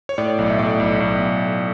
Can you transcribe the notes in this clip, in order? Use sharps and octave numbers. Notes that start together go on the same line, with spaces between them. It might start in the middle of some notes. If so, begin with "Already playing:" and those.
C#5
A2 D5
B1
E5
A2 D5
B1
B1